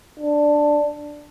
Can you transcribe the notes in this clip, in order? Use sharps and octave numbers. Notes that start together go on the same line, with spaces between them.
D4